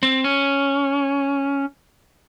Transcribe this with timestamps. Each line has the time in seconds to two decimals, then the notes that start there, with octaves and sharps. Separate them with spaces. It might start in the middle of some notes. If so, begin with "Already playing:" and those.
0.03 C4
0.24 C#4